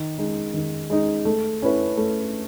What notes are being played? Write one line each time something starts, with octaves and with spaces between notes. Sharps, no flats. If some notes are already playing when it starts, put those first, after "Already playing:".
Already playing: D#3
G#3 D#4
D#3
G#3 D#4
A3
C#4 E4 B4
A3